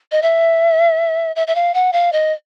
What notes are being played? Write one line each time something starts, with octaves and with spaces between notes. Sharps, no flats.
D#5
E5
E5
E5
F5
F#5
F5
D#5